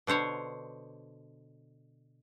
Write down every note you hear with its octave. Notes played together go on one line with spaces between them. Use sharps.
B2 D3 C5 C#5